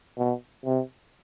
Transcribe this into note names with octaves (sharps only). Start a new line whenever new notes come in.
B2
C3